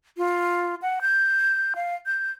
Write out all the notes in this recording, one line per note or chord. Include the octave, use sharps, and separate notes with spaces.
F4
F#5
G6
F5
G6